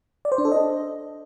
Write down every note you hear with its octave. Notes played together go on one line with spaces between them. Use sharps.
D5
C5
D4
A4
D#5